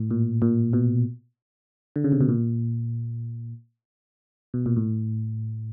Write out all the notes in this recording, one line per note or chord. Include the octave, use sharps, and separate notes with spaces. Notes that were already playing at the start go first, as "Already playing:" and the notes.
Already playing: A2
A#2
A#2
B2
D3
C#3
C3
B2
A#2
B2
A#2
A2